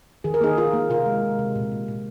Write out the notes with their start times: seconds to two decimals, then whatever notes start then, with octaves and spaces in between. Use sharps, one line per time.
0.24 D#3 G#4
0.34 A#4
0.41 A#3 D#4 G#4
0.57 A#3 F4 A#4
0.73 A#3
0.90 C3 F4 A#4
1.06 G#3
1.23 C3
1.39 C3
1.56 A#2
1.72 A#2
1.88 A#2